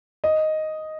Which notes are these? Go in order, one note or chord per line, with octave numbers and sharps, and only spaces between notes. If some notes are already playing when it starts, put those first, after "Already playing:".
D#5